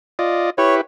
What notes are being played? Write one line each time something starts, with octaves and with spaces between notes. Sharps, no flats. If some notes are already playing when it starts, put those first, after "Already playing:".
F4 D5 D#5
E4 G4 B4 C#5